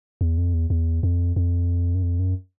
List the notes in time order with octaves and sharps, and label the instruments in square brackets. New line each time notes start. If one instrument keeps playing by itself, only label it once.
[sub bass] E2
F2
E2
E2
F2
F2
F#2
F2
F#2